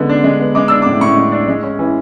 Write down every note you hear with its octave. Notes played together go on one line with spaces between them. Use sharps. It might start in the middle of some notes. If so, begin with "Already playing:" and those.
Already playing: D3 G#3 B3
D4
G#3
B3
G#3 D6
D4 E6
A2 D6
A2 C#6
G#3
D4
G#3
C#4
E3